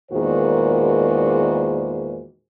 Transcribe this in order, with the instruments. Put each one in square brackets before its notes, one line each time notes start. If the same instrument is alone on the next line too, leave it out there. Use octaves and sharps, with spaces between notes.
[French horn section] E2 A#2 D#3 G#3 F#4 C5